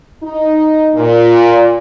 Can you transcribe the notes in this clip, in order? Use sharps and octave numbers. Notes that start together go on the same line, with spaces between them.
D#4
A#2